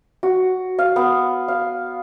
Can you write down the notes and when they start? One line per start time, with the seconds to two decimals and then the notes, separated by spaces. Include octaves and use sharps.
0.23 F#4
0.79 F5
0.96 B3
1.48 F5